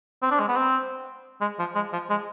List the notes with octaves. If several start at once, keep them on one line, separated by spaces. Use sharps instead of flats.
C4
D4
G#3
B3
C4
G#3
F3
G#3
F3
G#3